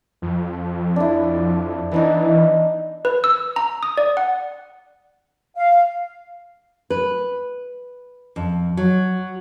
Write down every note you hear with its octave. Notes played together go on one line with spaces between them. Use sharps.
F2
D4 E4
E3 B3 D4 D#4
B4
E6
A#5
D#6
D5
F#5
F5
B4
F2
F#3